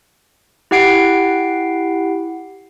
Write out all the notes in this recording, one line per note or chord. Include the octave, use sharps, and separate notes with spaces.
E4 G4 F#5 C7 D7